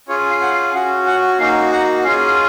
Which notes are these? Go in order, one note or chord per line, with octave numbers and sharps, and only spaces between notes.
C#4 F4 G#4 C#5
F5
F#5
F5
C#4 F#4 F#5
F#5
A#3 D#4 F#4 F5
F#5
C#4 F4 G#4 F5